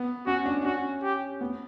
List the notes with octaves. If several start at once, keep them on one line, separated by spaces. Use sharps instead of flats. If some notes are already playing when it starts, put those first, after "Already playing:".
Already playing: B3
C#4 F#4
D4
C#4 F#4
G4
B3